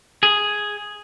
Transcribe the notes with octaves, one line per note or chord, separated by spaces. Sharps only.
G#4